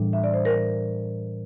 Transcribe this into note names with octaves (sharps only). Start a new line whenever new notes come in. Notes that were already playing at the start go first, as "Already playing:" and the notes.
Already playing: A2 E3 G3 D4
E5
D5
C5
A#4